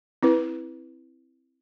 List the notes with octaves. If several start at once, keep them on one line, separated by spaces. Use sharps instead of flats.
C4 E4 B4